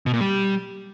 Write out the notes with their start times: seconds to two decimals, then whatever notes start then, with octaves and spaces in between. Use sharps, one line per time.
0.06 B2
0.13 A#2
0.21 G3